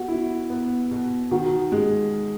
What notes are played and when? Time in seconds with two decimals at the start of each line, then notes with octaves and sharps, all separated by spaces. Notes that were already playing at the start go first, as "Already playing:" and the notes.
Already playing: B3 F#4
0.08 E4
0.50 B3
0.91 B2
1.31 D#3 F#4
1.72 G#3